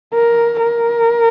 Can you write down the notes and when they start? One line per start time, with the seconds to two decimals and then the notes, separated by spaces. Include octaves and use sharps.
0.14 A#4
0.64 A#4